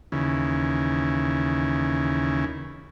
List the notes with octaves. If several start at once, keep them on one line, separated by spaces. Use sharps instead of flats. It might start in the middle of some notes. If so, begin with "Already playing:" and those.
D#2 C#3 E3